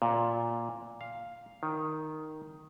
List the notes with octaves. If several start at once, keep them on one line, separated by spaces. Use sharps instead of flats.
A#2
F5
D#3